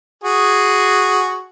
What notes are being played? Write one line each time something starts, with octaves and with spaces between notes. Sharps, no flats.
F#4 G#4